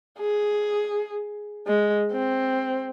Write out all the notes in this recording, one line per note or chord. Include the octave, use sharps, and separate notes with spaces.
G#4
G#3
C4